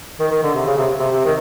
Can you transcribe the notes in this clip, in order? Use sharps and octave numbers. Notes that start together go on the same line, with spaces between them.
D#3
D#3
D3
C3
C#3
C3
C3
C3
D#3